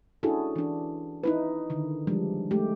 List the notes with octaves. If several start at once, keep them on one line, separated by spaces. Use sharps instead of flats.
C#4 D4 E4 F#4 G#4 A4
E3 D4
D#4 E4 B4
D3 D#3
F3 G3 G#3 D4
G#3 A3 G4